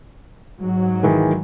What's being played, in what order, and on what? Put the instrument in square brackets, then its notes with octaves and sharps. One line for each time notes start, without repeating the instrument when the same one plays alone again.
[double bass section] G#2 F#3
[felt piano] D#3 E3 G#3